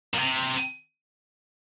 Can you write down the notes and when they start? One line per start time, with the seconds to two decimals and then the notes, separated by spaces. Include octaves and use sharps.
0.14 A#2
0.17 C3